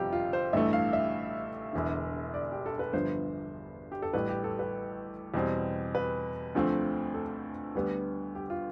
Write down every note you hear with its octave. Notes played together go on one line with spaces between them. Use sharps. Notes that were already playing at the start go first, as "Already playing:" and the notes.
Already playing: G1 F2 C3 G3 C4 F4 G4
F4
C5
A1 G2 E3 A3 E5
F5
E5
E1 E2 D3
D5
G4
A4
B4
G1 G2 F3 B3 C5
G4
A4
A1 A2 G3 B4
G4
A4
B4
E2 B2 G3 C4
B4
D2 D3 F3 A3 C4
A4
D2 D3 G3 B3
G4
F4